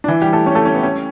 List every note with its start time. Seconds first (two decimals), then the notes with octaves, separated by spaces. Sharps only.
0.04 D4
0.08 E3 E4
0.22 G3 G4
0.33 A3 A4
0.46 C#4 C#5
0.55 A3 A4
0.65 C#4
0.74 B3
0.83 C#4